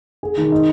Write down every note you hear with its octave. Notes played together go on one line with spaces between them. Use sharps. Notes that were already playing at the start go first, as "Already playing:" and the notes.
G#4
D#3
D#4